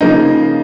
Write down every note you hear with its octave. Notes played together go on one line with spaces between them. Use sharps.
C#3 F3 A#3 D#4